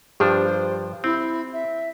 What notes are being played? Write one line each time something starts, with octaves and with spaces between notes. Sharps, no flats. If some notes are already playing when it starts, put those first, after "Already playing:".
G2 F3 D4 G4 C5
C4 E4
E5